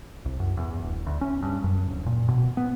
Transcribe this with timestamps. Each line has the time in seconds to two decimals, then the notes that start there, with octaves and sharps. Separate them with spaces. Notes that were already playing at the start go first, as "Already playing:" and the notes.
0.25 C2
0.40 F#2
0.57 E2
0.83 D1
1.06 D2
1.21 C#4
1.42 G2
1.64 F#2
1.89 D1
2.06 A#2
2.28 B2
2.57 B3